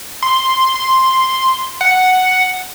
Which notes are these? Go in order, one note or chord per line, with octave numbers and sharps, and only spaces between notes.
C6
C6
F#5